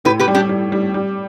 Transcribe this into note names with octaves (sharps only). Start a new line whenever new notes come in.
A2 G4 B4
G4 B4
G3
D4 G4
G3
G3
G3